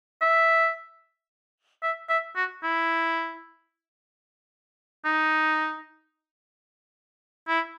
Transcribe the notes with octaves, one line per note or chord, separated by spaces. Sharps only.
E5
E5
E5
F#4
E4
D#4
E4